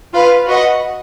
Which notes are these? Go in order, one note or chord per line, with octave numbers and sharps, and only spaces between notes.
F4 B4 F5
F#4 B4 D#5 F#5